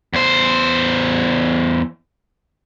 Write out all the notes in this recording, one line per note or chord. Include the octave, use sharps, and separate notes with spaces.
E2 C5